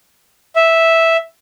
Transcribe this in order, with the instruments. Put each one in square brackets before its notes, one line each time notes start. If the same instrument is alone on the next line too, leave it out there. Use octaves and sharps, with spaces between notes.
[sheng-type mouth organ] E5